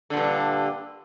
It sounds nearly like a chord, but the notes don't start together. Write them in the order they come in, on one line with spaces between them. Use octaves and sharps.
D3 A#2 G2